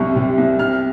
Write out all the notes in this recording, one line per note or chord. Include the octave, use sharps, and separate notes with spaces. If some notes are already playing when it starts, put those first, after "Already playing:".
Already playing: C2 F#2 C3 C#6
C3
C2
C3 F6